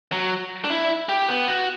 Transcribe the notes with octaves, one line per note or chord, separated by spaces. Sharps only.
F#3
D4
E4
G4
B3
F#4